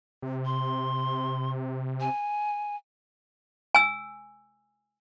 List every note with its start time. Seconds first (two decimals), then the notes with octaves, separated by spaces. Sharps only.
0.22 C3
0.45 C6
2.01 G#5
3.75 G#5 E6